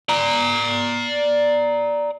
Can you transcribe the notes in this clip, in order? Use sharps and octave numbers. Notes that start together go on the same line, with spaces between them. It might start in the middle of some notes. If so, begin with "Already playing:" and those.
D5 A#5